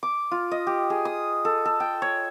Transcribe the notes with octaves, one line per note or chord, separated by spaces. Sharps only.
D6
F4
D#5
G4
G#4
D#6
A4
A4
G5
C#5